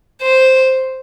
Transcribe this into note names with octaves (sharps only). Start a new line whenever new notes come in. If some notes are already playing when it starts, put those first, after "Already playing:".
C5